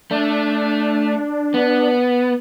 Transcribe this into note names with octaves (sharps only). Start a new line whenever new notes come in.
A3 D4
B3